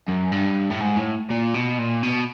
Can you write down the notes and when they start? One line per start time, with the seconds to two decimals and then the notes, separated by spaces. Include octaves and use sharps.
0.08 F#2
0.32 G2
0.71 A2
0.81 G#2
0.97 A2
1.30 A#2
1.54 B2
1.78 A#2
2.03 B2